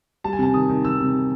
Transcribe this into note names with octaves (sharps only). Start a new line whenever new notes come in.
G3 A5
G#5
C3 A5
D#3 D#6
D#3
D#3 E6
C3